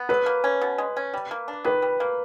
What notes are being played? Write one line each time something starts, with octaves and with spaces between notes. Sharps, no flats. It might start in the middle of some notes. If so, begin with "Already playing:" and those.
Already playing: B3
F#3 B4
A#3
C#4
B2
G#3
C#4
G3
A#3
D4
D#3 B4
G3
A#3